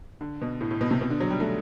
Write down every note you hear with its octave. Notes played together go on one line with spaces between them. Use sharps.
D3
B2
A2
A2
B2
C3
B2
D3
F#3
G3
A3